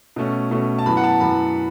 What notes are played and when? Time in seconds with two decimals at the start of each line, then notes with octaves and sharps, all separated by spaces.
0.16 B2 A3 C#4
0.51 B2 A3 C#4
0.79 A5
0.86 F#2 E3 B3 B5
0.97 F#5
1.04 A5
1.20 F#2 E3 B3 B5